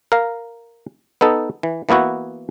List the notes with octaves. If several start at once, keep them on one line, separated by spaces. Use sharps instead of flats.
A#4 F5
B3 D#4 A4
E3
E3 A#3 B3 E4 F#4